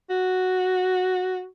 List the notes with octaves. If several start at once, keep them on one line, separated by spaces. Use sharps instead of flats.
F#4